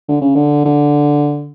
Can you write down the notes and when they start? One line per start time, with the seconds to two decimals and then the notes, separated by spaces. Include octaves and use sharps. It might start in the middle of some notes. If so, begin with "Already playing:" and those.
0.08 D3
0.22 C#3
0.36 D3
0.65 D3